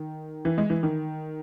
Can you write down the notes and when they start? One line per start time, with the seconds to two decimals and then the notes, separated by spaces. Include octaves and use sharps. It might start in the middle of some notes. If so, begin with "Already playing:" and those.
Already playing: D#3
0.45 E3
0.58 G#3
0.70 E3
0.83 D#3